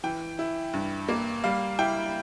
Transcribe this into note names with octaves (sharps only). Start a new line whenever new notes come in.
E3 G5
E4
G2
A#3
G3 F5
E4 G5